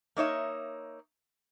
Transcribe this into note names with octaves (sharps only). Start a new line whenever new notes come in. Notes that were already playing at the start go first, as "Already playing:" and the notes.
A#3 D#4 C#5 E5